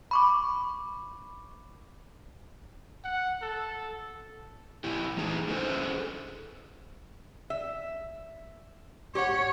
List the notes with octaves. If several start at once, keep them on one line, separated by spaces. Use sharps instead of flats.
B5 C#6 D6
F#5
A4
A#2 E4 G4
E3 A3 D#4 G#4
D3 C#4 G#4 A4 B4 C5
E5
G4 C#5 F#5